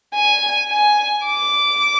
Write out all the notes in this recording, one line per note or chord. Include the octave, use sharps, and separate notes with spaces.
G#5
G#5
D6